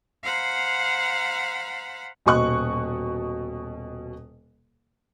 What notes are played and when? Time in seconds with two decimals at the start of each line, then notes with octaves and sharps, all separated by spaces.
0.23 C5 F5 F#5 A#5 B5
2.26 D#1 B2 D#5 C#6 F#6